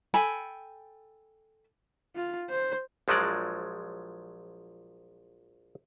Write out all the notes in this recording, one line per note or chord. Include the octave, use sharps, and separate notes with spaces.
A4 G5 G#5 B5
F4
C5
A#1 F3 F#3 G#3 D5